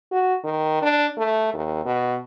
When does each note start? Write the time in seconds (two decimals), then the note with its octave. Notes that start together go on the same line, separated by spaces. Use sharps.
0.12 F#4
0.44 D#3
0.82 D4
1.17 A3
1.54 D#2
1.85 B2